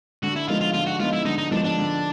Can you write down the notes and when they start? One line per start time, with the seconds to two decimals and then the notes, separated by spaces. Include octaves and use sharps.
0.23 D3 F#4
0.36 E4
0.48 F3 G#3 B3 D#4 F4
0.61 F4
0.74 D3 F4
0.87 F#4
1.00 F3 G#3 B3 D#4 F4
1.13 E4
1.25 D3 D#4
1.38 D#4
1.51 F3 G#3 B3 D4 D#4
1.64 D4
1.78 D3